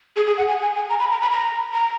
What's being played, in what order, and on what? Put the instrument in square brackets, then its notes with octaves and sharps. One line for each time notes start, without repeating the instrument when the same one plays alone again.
[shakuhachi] G#4
G#4
F#5
G#5
G#5
G#5
A#5
B5
A#5
B5
A#5
A#5